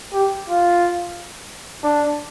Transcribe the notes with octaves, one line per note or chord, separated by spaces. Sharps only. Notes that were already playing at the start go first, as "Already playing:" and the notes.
G4
F4
D4